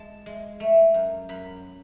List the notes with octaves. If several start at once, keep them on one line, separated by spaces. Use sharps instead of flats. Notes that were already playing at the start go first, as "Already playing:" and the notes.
Already playing: G#3 A5
G#3
A3
F#2
F#2 B5